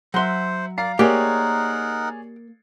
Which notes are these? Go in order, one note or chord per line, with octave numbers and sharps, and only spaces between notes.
F#3 C5 E5 F#5 C6
D5 F5 A#5 C7
A#3 D#4 G4 G#4 A#4 C#5 D5 F#5